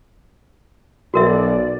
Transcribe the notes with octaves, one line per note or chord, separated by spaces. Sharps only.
B1 F#4 A#4 D5 E5